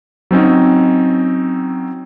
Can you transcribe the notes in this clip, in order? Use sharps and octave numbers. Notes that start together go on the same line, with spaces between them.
F#3 C4 C#4 D#4